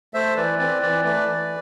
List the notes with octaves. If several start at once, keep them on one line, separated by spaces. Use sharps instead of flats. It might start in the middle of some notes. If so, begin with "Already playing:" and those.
A3 C5 E5
E3 B4 D5
C4 B4 D5
E3 B4 D5
A3 B4 D5
E3